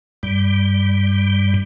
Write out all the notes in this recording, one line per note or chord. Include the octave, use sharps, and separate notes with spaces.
G2 G3